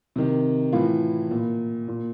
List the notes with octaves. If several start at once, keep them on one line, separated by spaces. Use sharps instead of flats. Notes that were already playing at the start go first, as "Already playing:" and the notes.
C3 D#3
A2 E3 F4
A#2
A#2